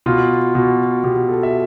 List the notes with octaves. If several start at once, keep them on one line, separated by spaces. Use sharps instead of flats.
B2 F4
B2
B2 G4
A4
E5